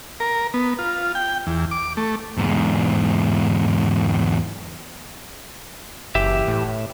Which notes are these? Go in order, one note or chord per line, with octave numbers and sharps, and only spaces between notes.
A#4
B3
F4
G5
E2
D6
A3
E2 G#2
F#1 E3 G4 E5
A2